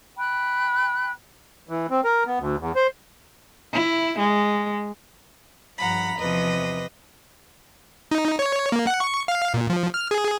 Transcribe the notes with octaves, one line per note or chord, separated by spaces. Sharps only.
G5 B5 F#6
E3
C4
A#4
B3
D2
E2
C5
E4
G#3
G2 F3 F#5 A#5 B5
E2 C3 F3 B4 D#5
D#4
C#5
A#3
F#5
C#6
F5
A#2
F3
F6
G#4